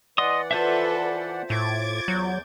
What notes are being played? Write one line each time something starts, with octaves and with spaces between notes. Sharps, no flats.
E3 D5 D#5 F#5 C6 D#6
F4 A4 B4 C5 E5
A2 D6 G#6 A6
E2 F#3 G6